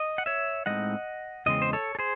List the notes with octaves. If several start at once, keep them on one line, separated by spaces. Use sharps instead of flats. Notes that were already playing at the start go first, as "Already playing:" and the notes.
Already playing: D#5
F#5
C#5 E5
A2 G#3 C4 D#4 D#5 F#5
E2 C#3 G#3 C4 D#5
C5
A4 C#5
A4
G#4 C5